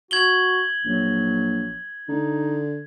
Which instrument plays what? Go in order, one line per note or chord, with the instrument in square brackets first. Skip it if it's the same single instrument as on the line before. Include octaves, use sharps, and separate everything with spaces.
[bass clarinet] F#4 [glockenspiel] G#6 F#7 G7
[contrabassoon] A#1 [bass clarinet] F#3
[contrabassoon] D3 [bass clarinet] D#4